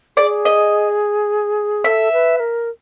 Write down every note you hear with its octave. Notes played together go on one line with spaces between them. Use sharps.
G#4 D5
D#5
A4 E5
B4
A#4